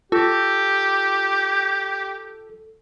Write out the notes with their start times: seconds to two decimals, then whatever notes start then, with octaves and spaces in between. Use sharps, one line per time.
0.12 F4 G4 A4